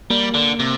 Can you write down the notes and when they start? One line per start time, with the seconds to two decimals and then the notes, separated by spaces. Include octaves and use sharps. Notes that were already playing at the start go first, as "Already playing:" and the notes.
0.10 G3 A#3
0.34 D3
0.60 C3